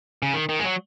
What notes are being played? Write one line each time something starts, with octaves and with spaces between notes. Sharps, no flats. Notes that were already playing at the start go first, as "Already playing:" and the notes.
C#3
D#3
D#3
G#3
F#3